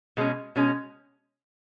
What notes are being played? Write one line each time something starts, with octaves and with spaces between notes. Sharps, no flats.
B2 G#3 C#4
B2 G#3 C#4